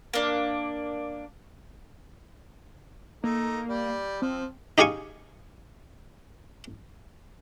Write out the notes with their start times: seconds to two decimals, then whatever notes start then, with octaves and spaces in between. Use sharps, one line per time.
0.13 A#3 D4
3.24 A3 A#3 D#4
3.69 G3 D5
4.22 F3 C4
4.78 D#4 G4 G#4 F5 G#5 C#6